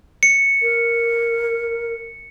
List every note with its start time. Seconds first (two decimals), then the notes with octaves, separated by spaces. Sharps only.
0.23 C#7
0.62 A#4